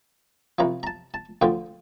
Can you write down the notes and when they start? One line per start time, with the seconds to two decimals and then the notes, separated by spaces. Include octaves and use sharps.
0.59 C2 C3 F3 A#5
0.83 A#5
0.87 A5
1.14 A5
1.41 D2 D3 F3 G5